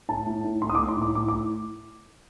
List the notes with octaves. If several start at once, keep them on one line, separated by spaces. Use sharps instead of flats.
A2 A5
A2
A2
A2 C6
D#6
D6
A2
C6
A2 D6
A2 D6
D6
A2